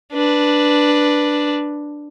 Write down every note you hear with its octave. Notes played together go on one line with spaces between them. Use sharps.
D4 B4